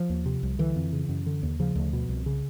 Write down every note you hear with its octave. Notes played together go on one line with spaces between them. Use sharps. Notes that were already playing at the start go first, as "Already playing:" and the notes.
Already playing: F3
D#2
C3
C2
D3 E3
F2
C#3
F#2
D3
D#2
C#3 F3
D2
B2
C2
C#3